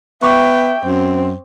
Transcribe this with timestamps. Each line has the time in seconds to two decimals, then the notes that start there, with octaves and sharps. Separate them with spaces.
0.22 B3 E5 G5 C#6 D6
0.85 F#2 C4